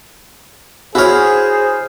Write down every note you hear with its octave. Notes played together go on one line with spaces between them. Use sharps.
E4 F#4 G#4 C5 C#5 F6